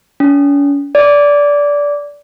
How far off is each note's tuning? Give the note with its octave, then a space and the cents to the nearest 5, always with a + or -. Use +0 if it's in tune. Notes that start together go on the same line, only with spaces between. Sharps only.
C#4 +45
D5 -15